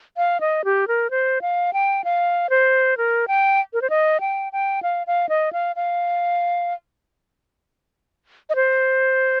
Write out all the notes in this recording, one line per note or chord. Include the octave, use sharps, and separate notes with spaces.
F5
D#5
G4
A#4
C5
F5
G5
F5
C5
A#4
G5
A#4
C5
D#5
G5
G5
F5
F5
D#5
F5
F5
D#5
C5